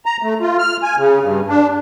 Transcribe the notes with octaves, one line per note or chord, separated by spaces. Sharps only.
A#5
A3
F4
F6
G#5
C#3
G2
D4